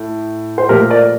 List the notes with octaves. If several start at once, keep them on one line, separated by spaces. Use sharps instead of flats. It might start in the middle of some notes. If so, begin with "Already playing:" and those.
Already playing: A2
C5
A#2 F3 A3 G4 A#4
A#4 D5